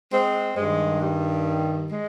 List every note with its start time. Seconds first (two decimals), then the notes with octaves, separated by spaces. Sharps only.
0.12 G#3 C4
0.57 G2 D#3 G#3
1.02 G3
1.92 G#3